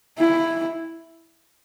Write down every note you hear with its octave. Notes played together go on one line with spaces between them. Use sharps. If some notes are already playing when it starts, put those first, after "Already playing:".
E4